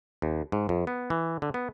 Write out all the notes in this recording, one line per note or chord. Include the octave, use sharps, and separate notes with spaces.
D#2
G#2
F2
B3
E3
D3
B3